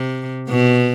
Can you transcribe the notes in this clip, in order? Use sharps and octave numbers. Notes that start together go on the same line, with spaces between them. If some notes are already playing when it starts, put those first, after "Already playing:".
Already playing: C3
B2